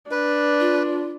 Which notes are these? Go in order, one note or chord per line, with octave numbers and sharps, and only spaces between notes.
D4 B4
F4